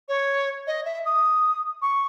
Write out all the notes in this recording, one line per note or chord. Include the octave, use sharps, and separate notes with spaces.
C#5
D#5
E5
D#6
C#6